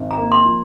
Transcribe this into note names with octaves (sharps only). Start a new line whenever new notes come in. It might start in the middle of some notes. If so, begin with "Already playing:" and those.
Already playing: G#1
A#5
A#3
C6
F3